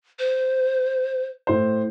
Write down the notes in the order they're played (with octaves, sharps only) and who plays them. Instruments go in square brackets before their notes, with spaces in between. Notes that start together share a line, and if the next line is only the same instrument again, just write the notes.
[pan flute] C5
[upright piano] A2 C5